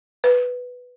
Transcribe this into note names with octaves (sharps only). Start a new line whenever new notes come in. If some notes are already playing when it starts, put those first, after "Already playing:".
B4